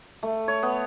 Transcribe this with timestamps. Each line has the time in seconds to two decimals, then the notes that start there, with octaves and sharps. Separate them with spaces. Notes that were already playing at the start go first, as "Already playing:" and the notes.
0.23 A3
0.48 C#5
0.63 B3